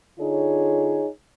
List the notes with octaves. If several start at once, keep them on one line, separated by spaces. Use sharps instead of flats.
D3 D#4 F4 G#4 C#5